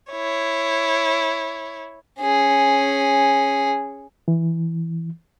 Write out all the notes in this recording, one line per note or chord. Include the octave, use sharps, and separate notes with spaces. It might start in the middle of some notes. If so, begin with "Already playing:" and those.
E4 C#5
C#4 G#4
E3